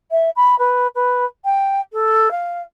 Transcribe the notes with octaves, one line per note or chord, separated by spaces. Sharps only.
E5
B5
B4
B4
G5
A4
F5